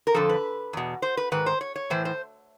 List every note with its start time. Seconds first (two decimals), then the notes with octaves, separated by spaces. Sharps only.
0.07 A#4
0.14 F2 D3 F3 A4
0.29 B4
0.73 E2 B2
1.02 C5
1.17 B4
1.32 G#2 D#3 B4
1.46 C5
1.61 C#5
1.76 C#5
1.90 A2 E3 C5
2.05 C5